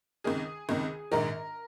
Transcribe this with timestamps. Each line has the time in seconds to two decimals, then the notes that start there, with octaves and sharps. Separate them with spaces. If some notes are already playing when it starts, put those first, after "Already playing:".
0.24 C#2 C3 D#3 G#4
0.69 C#2 C3 D#3
1.12 A#1 G#2 D#3 A#4